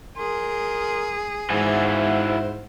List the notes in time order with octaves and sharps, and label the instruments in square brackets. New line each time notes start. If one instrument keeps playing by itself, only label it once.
[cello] G#4 [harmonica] A#4 C6
[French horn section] G#2 [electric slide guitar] E4 F#4 G#5 [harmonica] C5 E5 F#5